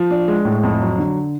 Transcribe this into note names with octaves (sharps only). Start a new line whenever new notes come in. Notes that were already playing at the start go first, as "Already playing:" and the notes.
Already playing: F3
D4
G#3
A2
F2
F#3
D3